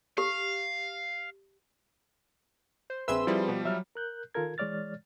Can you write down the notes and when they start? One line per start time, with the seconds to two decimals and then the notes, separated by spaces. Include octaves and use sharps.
0.18 G4 F5
2.90 C5
3.08 A#1 C4 G#4 B4 E5 C6 E6
3.27 F3 G3 E4
3.48 B2 G4
3.65 F#3 E5 F6
3.95 A#4 F#6 G6
4.34 D#3 F4 A4 A#4 G#6
4.58 E3 G#3 C#5 D5 F6 A6